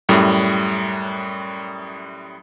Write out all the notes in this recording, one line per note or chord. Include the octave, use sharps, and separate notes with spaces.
F#2 A2 G3